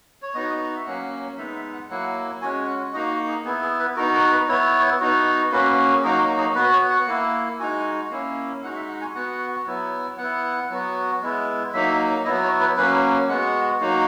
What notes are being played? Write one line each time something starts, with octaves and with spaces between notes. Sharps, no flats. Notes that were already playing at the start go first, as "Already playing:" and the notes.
C#5
B3 D#4 F#4 D#5
E5
F#3 A#3 C#4 F#5
G#3 B3 D#4 E5
E5
F#5
F#3 A#3 E4 F#5
G#3 C#4 F#4 G#5
F#5
A#3 D#4 F#4 D#5
F#4
G#4
B3 E4 G#4
G#4
B4
B3 D#4 F#4 A#4
A#4
B4
B3 E4 C#5
B3 D#4 F#4
A#3 C#4 F#4 B4
G#4
F#3 A#3 D#4 F#4 A#4
A#4
G#4
B3 F#4 B4
C#5
F#5
A#3 E4
G#3 D#4 F#4 G#5
A#3 C#4 E4
G#3 D#4 F#4 F#5
E5
F#5
G#5
B3 F#4 F#5
F#3 B3 E4
B3 E4 F#5
F#3 B3 F#4
G#3 B3 E4
F#3 A#3 D#4 E5
F#3 B3 E4 D#5
C#5
B4
F#3 A#3 C#4 B4
G#3 B3 F#4 F#5
F#3 A#3 D#4 F#4